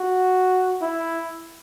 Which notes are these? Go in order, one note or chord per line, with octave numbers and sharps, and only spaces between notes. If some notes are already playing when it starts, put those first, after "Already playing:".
Already playing: F#4
E4